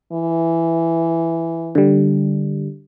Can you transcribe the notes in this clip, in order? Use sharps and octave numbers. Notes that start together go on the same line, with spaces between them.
E3
D3 G3